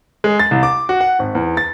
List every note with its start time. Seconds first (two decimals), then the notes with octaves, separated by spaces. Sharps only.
0.24 G#3
0.39 A6
0.51 C2
0.63 D6
0.89 F#4
1.01 F#5
1.19 G#1
1.35 E2
1.57 A6